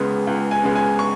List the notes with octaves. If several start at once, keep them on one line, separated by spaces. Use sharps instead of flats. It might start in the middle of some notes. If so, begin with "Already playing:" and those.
Already playing: C#2 C#3 G#3 B3
C#2
G#5
C#3 G#3 B3
G#5
C#6